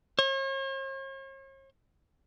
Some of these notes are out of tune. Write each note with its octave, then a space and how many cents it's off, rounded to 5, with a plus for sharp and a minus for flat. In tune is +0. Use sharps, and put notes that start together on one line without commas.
C#5 -45